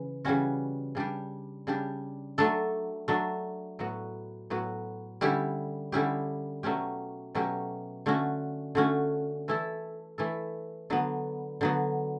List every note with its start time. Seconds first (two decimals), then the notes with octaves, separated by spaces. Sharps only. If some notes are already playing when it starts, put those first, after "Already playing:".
Already playing: C#3 E3
0.25 C#3 E3 G3 C#4 F#4
0.95 C#3 G3 D4 G4
1.67 C#3 G3 D4 G4
2.38 F#3 A3 D4 A4
3.08 F#3 A3 D4 A4
3.79 A2 F#3 B3 F#4
4.50 A2 F#3 B3 F#4
5.21 D3 G3 C#4 E4 G4
5.92 D3 G3 C#4 E4 G4
6.63 B2 F#3 A3 C#4 G4
7.35 B2 F#3 A3 C#4 G4
8.06 D3 A3 C#4 F#4
8.75 D3 A3 C#4 F#4
9.48 E3 A3 E4 A4
10.18 E3 A3 E4 A4
10.90 D3 F#3 B3
11.61 D3 F#3 B3